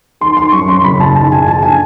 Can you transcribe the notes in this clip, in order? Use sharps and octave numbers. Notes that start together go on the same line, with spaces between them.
D#3 C6
D#3 C6
F#2 C#6
F#2 C6
F#1 B5
F#1 A5
D#3 A5
F#1 G#5
F3 A5
D3 G#5